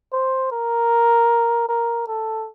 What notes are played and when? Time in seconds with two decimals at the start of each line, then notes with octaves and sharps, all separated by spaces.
0.13 C5
0.52 A#4
1.69 A#4
2.08 A4